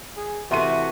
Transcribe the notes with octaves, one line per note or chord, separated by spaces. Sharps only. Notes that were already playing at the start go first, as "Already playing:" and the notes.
G#4
C3 E3 A3 F#4 E5 C6 D#7